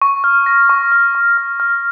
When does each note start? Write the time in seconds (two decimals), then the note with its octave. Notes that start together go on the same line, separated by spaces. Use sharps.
0.02 C#6
0.24 F6
0.46 A#6
0.69 C#6
0.92 F6
1.15 C#6
1.37 F6
1.60 F6